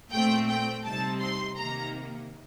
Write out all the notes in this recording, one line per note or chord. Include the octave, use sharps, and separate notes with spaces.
A#2 A3 C4 G5
G5
C3 G3 C4 D#4 A5
C6
C3 D#3 A#3 A#5